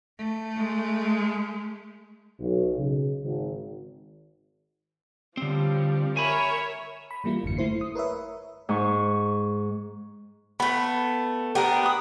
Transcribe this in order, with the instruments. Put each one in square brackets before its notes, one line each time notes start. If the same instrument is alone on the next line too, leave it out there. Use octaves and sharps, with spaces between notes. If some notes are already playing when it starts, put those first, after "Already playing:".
[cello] A3
[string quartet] G#3
[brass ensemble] B1
C#3
G#1
[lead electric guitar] D3 C4 [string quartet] F3 G3
[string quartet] A#4 C#5 E5 [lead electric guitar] G#5 B5
[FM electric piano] B5
E3 G3 A#3 E4 F4
G#1 F#2 D3 C#7
A3 E4 C5 C7
D#6
A#4 B4 C#5 E5
[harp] G#2 C#6
[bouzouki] A3 B3 [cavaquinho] B5
[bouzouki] B3 D4 [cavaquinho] G4 A#4
[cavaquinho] B4 D#6